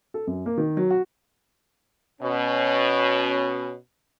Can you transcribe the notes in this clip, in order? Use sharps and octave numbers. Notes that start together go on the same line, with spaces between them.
A4
F#2
A#3
D#3
F#3
F#4
B2 C#4